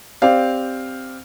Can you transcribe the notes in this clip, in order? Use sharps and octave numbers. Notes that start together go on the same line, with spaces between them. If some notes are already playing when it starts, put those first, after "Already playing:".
C4 G4 D5 F5